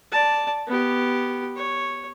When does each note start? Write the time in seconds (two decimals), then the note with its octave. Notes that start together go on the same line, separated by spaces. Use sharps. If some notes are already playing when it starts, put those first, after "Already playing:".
0.12 D5 A5
0.67 B3 G4
1.56 C#5